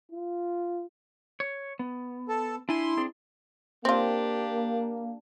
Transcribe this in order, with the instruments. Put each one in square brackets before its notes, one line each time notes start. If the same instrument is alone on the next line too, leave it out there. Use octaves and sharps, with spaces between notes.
[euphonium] F4
[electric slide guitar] C#5
B3
[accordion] A4
[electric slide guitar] D4 G#5 [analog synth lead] E4 [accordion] C6
[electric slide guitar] C4 D4 G#4
[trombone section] A#3 [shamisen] C4 F4 [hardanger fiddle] D4 G4